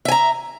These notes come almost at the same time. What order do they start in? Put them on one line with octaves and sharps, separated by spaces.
E5 G#5 A#5